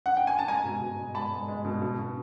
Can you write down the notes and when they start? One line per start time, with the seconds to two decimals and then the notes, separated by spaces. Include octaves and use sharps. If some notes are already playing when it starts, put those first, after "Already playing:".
0.06 F#5
0.17 G5
0.27 G#5
0.39 A5
0.48 G#3 G#5 A#5
0.65 B2
0.82 B2
0.99 G#3
1.15 G#3 A5 B5
1.32 G#3
1.48 G#3
1.65 B2
1.82 B2
1.99 B2